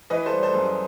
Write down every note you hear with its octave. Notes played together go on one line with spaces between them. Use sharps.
E3 B4 D#5
A4 C5
G3
A4 C5
F#2